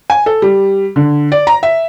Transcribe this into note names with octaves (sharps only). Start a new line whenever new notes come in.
G#5
A4
G3
D3
D5
A#5
E5